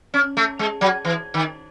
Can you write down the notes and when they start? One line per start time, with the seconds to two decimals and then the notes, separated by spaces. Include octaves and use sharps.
0.14 C#4
0.37 A3
0.59 G#3
0.81 F#3
1.05 E3
1.34 D#3